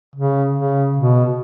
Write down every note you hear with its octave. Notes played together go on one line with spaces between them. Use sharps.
C#3
C#3
B2